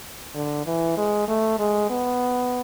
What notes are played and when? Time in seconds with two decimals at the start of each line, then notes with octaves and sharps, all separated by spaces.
0.35 D3
0.66 E3
0.97 G#3
1.28 A3
1.59 G#3
1.90 B3